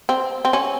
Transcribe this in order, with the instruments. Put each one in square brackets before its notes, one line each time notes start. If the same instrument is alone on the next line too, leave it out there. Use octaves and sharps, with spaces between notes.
[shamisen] C4
C4
C#4